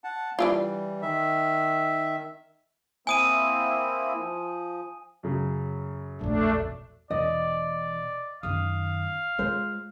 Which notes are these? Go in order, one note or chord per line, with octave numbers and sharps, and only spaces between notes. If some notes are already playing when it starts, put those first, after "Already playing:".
F#5 A5
E3 G3 D4 E4 F4
D#3 E5
A#3 C4 E4 G#5 D#6 D#7
F3
F#2 C#3 F#3
E1 A#1 A3 D4
E1 E3 D5 D#5
F#2 D#3 F5 D#6
G#3 F4 C5